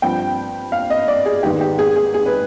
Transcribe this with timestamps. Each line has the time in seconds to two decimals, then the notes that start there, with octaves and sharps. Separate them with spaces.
0.02 G2 F3 C4 G5
0.72 F5
0.90 D#5
1.08 D5
1.26 G#4
1.43 G#2 D#3 G#3 B3 D#4 G4
1.61 G4
1.79 G#4
1.96 G#4
2.14 G#4
2.26 B4